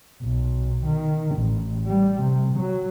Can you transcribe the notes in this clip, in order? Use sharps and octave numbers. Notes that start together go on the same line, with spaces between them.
B1
D#3
A1
G3
C3
F#3